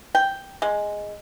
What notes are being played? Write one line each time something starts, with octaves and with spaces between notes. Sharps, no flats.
G5
G#3